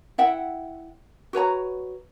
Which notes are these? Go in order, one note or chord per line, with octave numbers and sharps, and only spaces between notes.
E4 E5 F#5 G5
F#4 B4 C#5 A#5